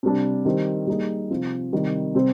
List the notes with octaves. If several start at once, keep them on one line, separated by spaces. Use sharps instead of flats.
C3 G3 D4
D#3 G3 C4 G4
G3 A#3 D#4 G#4
C3 F3 C4 F4
C3 D#3 G3
C3 G3 C4